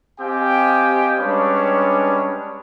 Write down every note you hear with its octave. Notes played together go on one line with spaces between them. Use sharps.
C4 G4 D#5 F5 G5 G#5
G3 G#3 C#4 D4 B4 C#5